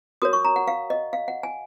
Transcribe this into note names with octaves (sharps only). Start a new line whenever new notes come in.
F#4 A#4 C#5 D#6
C#6
A#5
F#5
F5
D#5
F5
F#5
G#5